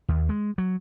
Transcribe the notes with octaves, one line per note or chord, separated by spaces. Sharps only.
D#2
G#3
F#3